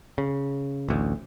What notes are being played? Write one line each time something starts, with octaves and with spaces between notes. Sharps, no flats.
C#3
A1 D2